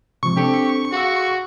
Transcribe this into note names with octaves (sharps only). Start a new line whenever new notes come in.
C3 F3 G#3 C#6
C4 D4 G4 A4
F#4 G#4 F5 E6